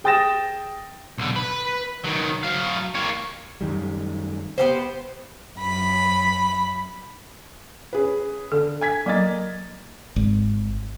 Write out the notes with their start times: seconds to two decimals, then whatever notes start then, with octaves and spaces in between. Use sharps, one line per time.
0.04 G#4 G5 D#6 A6 A#6 E7
1.18 B1 D3
1.36 B4 B5
2.04 D#3 F#3
2.43 F#3 F5
2.95 A#3 C#5
3.61 F#2 D#3 G3
4.58 B3 G4 C5
5.58 F#2 B5
7.93 C#4 G#4 B4
8.52 D3 A4
8.81 G#5 G#6 B6
9.06 F#3 A#3 D#5 A6
10.16 G#1